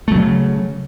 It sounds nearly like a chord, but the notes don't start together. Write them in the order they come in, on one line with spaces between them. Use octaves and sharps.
A3 F#3 C#3